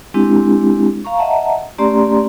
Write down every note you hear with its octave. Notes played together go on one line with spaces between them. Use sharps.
G#3 C4 D4 E4 G4
F5 A#5 C#6
D#5 E5 F#5 A5 A#5
A3 C#4 G4 D5 A#5 C6